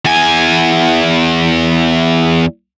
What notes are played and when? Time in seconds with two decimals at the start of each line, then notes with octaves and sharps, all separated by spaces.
0.05 E2 G#5